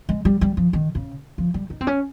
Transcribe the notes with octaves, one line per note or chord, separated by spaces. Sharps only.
G#3
G3
G3
F3
D#3
C#3
F3
G3
D#4
C4
C#4